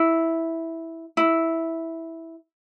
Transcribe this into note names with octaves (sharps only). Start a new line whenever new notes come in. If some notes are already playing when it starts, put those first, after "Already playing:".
Already playing: E4
E4